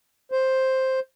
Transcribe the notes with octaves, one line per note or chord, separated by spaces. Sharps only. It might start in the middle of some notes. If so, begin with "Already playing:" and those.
C5